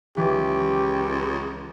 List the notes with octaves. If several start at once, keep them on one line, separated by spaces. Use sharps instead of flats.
C#2 E3 G4